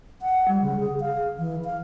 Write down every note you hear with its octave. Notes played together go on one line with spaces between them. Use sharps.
F#5
G3
C#3
G#4
F5
E3
F5